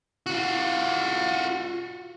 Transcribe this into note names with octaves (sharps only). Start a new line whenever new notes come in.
F4 F#4